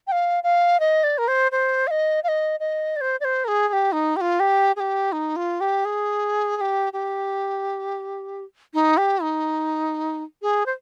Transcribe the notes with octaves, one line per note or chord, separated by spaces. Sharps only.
G5
F5
F5
D#5
D5
A#4
C5
C5
F5
D#5
F5
D#5
D#5
D5
C5
D5
C5
A#4
G#4
G#4
G4
D#4
G4
F4
G4
G#4
G4
D#4
F4
G4
G#4
G#4
G4
G4
D#4
G4
D#4
G#4
C5